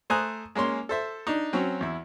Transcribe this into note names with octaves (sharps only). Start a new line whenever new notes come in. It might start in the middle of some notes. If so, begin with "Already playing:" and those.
A3 C5 G#5 A#5 D#6 F#6
G#3 A#3 C#4 C6
A4 C5 E5
D4 D#4
F#3 C4 C#4
E2 E4